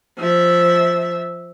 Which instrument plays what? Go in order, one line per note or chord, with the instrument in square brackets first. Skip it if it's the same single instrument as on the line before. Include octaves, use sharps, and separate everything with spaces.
[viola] F3 E5